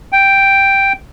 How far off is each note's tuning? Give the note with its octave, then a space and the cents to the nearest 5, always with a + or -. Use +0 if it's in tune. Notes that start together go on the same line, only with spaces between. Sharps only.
G5 +0